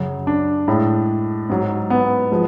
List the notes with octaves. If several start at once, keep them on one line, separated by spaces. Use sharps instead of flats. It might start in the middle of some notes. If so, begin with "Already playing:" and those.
Already playing: F#2 C#3 F#3
D4
A2 G#3
G#2 F#3
B3
F3 G#3